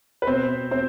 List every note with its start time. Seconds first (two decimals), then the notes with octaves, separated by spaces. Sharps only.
0.22 B4
0.27 B2 C4 C5
0.71 C4 C5